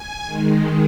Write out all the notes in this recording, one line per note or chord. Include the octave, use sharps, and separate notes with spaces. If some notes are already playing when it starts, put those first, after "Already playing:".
Already playing: G#5
D#3 G#3